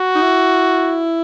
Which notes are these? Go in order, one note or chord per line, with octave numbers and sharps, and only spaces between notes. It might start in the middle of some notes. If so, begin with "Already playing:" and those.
Already playing: F#4
D#4
E4